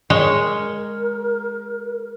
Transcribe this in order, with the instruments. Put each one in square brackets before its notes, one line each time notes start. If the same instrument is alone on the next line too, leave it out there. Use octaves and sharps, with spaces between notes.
[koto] G#3 C#5 [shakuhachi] A#4